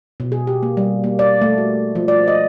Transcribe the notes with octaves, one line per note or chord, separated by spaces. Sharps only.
B2
G#4
G4
A#3
G3
A#3
D5
A3
F#4
F3
D5
D#5